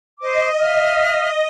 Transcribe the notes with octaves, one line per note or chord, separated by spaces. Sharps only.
C5 D#5 D6
E5 F5 F6